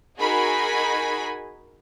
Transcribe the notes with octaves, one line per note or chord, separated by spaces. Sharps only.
D#4 F#4 G#4 A#4 G#5 B5